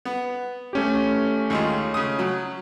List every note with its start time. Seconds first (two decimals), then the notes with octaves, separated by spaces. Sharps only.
0.05 B3
0.73 A3 C#4 G4
1.50 D#2 G#3 F4
1.94 C#3 D#6
2.19 F#3